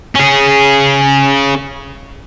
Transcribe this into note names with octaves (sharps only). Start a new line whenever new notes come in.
C#4 G#4